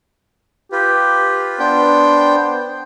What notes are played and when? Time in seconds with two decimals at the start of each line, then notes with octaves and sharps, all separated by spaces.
0.72 F4 G4 B4
1.59 B3 D4 C5 G5